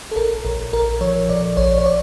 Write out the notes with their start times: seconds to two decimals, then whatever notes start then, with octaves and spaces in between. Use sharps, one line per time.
0.11 A4
0.16 A#1 A#4
0.45 A#1 A#4
0.73 A#1 A#4
1.01 F3 C#5
1.29 A#1 D5
1.57 A#1 C#5
1.78 C#5
1.86 D5